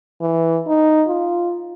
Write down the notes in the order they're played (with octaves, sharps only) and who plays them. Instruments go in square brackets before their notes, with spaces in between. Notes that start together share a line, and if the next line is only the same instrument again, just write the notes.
[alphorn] E3
D#4
F4